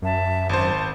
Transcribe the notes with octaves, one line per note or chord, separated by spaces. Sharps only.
F#2 E5 A5
G#1 C5 A5